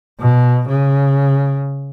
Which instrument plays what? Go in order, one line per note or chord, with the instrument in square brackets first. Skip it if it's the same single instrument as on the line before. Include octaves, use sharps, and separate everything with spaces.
[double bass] B2
C#3